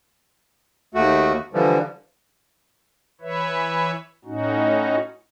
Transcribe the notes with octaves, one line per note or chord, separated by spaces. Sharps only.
D#2 A3 F#4
D3 E3 F3 G3
E3 B4 C#5 E5
A2 C#4 D#4 F#4